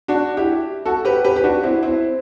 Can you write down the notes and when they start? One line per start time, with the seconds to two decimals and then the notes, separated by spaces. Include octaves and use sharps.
0.08 D4 F#4
0.37 E4 G4
0.85 F#4 A4
1.05 G4 B4
1.24 G4 B4
1.36 G4
1.44 D4 F#4
1.63 C4 E4
1.83 C4 E4